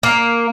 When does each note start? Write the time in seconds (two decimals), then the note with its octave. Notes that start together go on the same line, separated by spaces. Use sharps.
0.03 A#3